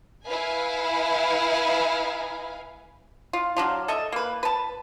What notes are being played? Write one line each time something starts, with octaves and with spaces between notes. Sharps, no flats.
E4 B4 F5 G#5
F4
F#3 D4 F4
A4 D#5 E5
A#3 B4
B4 A5